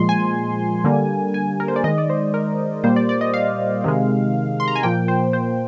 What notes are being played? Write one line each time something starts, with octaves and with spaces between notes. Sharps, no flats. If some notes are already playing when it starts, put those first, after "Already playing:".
Already playing: A#2 F3 G#3 C6
G#5
D3 G3 A#3
G#5
A#4
C5
D5
D#3 G#3 D#5
D5
C5
A#4
A#2 G3 A#3 C5
D5
D5
D#5
F5
C3 D#3 G#3
C6
A#5
G#5
A#2 F3 A#3 G5
C5
C5